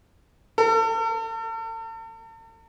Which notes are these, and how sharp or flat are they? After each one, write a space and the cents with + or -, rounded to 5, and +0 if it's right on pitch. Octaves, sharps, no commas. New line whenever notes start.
A4 +40